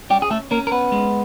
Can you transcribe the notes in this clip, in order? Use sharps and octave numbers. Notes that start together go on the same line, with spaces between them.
G3 C#4 G4
G#4
A3 A4
A#3 C#4 A#4
A#4
B3 B4
G#3